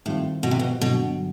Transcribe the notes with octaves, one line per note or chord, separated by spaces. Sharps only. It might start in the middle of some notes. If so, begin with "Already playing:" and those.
A2 D#3 G3 C4 F4
B2
C3
B2
G2 B2 D3 F#3